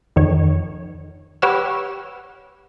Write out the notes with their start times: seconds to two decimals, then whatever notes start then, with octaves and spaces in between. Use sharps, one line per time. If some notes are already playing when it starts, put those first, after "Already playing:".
0.16 F2 D#3 C#5
1.42 G4 B4 C#5 F#5 E6 F6